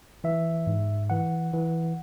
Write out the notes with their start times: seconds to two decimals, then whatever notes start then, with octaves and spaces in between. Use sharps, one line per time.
0.24 E3 E5
0.67 G#2
1.10 E3 F#5
1.54 E3